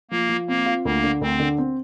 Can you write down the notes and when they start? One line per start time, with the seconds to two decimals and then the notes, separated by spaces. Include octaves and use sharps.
0.11 F3 A#3
0.29 F3
0.48 A#3 C4
0.66 F4
0.85 D2 A#3
1.04 D3
1.21 D2 C4
1.40 D3
1.58 C4